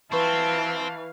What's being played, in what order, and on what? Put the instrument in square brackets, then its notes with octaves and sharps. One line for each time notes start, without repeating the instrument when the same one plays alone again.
[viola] E3 F5 [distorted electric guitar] C4 [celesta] B4 B5 C#6 [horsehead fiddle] A5